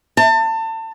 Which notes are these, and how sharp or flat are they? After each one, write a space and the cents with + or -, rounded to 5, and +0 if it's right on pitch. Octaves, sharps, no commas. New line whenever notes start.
A5 +30